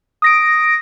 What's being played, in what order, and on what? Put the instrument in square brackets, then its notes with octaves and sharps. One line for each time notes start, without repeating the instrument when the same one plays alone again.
[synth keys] D#6 A#6 D7